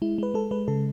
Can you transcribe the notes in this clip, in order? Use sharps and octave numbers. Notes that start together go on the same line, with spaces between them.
G#3 E4
G#3 B4
G#3 A4
G#3 B4
C#3 A4